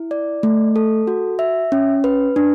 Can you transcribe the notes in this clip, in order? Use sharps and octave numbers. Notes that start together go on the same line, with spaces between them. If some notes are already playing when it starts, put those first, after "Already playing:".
Already playing: E4
D5
A3
A4
F#4
E5
C#4
B4
D4